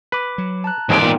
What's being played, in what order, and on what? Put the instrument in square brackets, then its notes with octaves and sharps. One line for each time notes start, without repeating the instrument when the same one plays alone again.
[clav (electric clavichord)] B4 [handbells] B5 D6
[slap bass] F#3
[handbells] A5 A#5 F#6
[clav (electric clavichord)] D#2 G#3 C4 [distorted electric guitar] G#2 D5 [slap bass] E3
[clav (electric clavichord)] A#2 [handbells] B3 D#4 G5